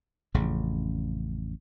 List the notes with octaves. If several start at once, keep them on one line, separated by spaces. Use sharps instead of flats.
A1 F2 C#3